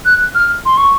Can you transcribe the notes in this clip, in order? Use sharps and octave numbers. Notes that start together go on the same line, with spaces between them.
F#6
F6
C6
C#6